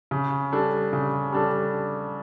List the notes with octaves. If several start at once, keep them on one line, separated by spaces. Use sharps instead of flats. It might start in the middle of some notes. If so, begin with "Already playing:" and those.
C#3
G3 D4 A4
C#3
G3 D4 A4